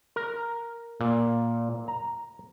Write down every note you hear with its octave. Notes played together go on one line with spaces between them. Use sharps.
A#4
A#2
A#5